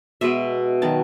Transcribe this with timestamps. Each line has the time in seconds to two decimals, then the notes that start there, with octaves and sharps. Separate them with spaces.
0.21 B2 G#3 B3 E5
0.82 D#3 F#3 B3 A5